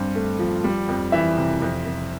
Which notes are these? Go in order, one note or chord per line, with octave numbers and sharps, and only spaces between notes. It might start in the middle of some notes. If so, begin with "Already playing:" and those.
Already playing: G2 C4
A3
F3
G3
F2
E3 E5
C3
F2
F2